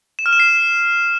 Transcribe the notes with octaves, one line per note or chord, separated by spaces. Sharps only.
E7
F6
E7
C7